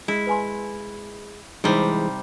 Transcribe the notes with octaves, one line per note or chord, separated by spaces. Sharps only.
G#3 E4
B4 G#5 C6
C3 E3 G3 G#3 D#4 C5